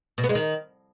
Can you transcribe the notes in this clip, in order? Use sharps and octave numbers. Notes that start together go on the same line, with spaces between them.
B2
B3
G#3
D#3